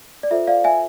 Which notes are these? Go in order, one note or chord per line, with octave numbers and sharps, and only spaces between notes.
D5
F4 A4 C5 E5
D5 F5
E5 G#5